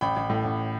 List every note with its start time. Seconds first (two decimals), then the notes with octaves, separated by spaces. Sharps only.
0.01 A1 G5 B5
0.16 A1
0.30 A2
0.44 A1